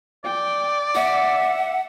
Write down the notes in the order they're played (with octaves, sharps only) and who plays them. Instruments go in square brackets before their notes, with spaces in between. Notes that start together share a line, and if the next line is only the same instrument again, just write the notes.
[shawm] D5 [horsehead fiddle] G5
[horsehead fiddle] E5 [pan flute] F#5